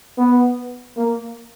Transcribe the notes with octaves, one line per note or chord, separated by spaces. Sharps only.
B3
A#3